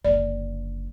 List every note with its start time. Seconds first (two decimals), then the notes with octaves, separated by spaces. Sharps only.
0.05 F#1 D3 D5